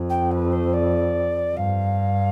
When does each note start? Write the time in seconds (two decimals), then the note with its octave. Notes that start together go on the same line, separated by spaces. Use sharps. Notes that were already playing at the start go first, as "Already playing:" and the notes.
Already playing: F2
0.09 G5
0.31 B4
0.52 C5
0.73 D5
1.56 G2 F5